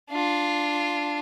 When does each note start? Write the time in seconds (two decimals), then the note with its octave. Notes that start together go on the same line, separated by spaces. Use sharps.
0.10 D4 F4